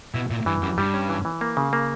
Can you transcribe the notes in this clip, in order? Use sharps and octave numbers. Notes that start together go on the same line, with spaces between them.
B2 E4
A#2 E4
G2 E3
F#2 G3
G2 G3
C#4
E3
E3
A#3
C#3
A#3